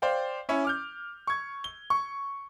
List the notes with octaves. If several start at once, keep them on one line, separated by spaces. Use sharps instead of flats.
C5 D5 F5 G5
C#4 E4
D6 F6 G6
C#6 G#6
G7
C#6